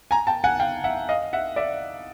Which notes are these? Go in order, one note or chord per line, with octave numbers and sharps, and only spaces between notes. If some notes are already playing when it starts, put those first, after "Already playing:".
G#5 A#5
G5 A5
F#5 G#5
F5 G5
E5 F#5
D#5 F5
E5 F#5
D5 E5